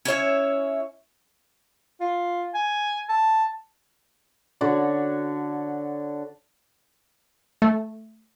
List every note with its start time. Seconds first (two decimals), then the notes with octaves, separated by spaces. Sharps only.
0.05 C#4 E4 C#5 E5
2.00 F4
2.54 G#5
3.09 A5
4.61 D3 F#4 C#5 D5
7.62 A3